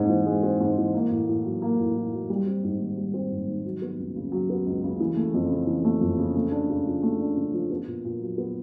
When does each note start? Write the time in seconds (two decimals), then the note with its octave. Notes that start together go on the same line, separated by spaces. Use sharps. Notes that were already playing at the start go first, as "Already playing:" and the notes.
Already playing: G#2 G#3 C4
0.09 E3
0.26 G#3
0.43 C4
0.60 G#2
0.78 E3
0.94 A#3
1.11 A2
1.28 A2
1.44 F#3
1.62 A#3
1.79 A2
1.95 A2
2.13 F#3
2.30 G3
2.46 C4
2.64 G#2
2.80 D#3
2.97 G3
3.14 C4
3.31 G#2
3.48 D#3
3.65 F#3
3.82 B3
3.98 C#2
4.15 C#3
4.32 F#3
4.50 B3
4.66 C#2
4.84 C#3
5.00 E3
5.16 A3
5.34 F2
5.51 C#3
5.67 E3
5.85 A3
6.01 F2
6.18 C#3
6.35 A3
6.52 D4
6.70 C#3
6.86 F3
7.03 A3
7.19 D4
7.37 C#3
7.53 F3
7.70 B3
7.87 A#2
8.04 A#2
8.21 F#3
8.38 B3